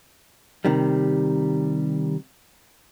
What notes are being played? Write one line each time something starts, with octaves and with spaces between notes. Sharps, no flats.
C3 D#3 G3